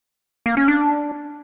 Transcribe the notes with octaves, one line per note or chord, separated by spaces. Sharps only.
A#3
C#4
D4